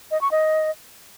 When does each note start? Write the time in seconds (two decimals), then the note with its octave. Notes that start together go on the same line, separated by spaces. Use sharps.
0.11 D#5
0.21 C#6
0.31 D#5